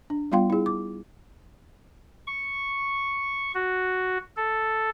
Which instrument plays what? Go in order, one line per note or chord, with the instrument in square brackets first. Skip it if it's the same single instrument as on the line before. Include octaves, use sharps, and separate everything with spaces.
[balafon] D4
G3 B3 F4 F5 G5 C6
E4 G#4
D6
[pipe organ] C#6
F#4
A4